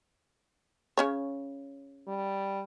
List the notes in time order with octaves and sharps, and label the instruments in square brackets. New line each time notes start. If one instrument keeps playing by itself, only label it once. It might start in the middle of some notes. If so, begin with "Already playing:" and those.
[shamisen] C#3 C#4 C#5
[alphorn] G3